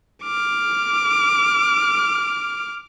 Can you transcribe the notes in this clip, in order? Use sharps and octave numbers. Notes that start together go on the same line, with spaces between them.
D6 F6